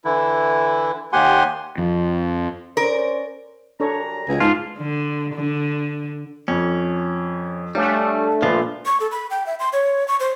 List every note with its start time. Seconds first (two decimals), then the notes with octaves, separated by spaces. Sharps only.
0.05 D3 E3 E4
1.13 D#2 G4 F#5 G#5 C6
1.78 F2
2.77 C#4 A#4 C5 D5
3.80 F#2 G3 D4 A4 C#5 A#5
4.28 C#2 B2 G#5
4.40 G#2 F4 A5
4.77 D3
5.34 D3
6.48 F2 C#4
7.75 G3 A3 D4 C#5 F5 G#5
8.42 A#2 F3 F4 B4
8.86 C#6
9.00 A4
9.12 B5
9.30 G5
9.46 E5
9.60 C6
9.73 C#5
10.08 C#6
10.20 C5